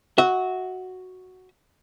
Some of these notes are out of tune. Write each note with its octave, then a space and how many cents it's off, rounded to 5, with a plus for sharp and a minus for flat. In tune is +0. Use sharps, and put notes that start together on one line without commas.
F#4 +0 E5 -30